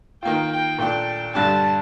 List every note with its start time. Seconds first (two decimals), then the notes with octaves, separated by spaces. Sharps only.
0.23 D#3 A#3 F4 G5
0.51 G5
0.79 A#2 A3 D4 G5
1.35 G2 D3 G3 D4 A5